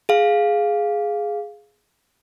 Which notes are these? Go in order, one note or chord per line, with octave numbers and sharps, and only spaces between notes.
G#4 F5